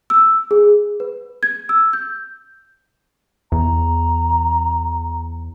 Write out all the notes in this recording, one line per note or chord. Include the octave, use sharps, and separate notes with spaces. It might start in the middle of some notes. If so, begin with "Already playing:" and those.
E6
G#4
B4
G#6
E6
G6
E2 A#5